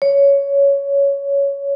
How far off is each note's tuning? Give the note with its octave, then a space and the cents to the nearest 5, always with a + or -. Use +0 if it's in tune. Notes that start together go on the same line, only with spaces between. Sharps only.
C#5 +10